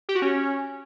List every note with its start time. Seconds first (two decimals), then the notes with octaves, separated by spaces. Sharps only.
0.09 G4
0.15 F#4
0.22 C#4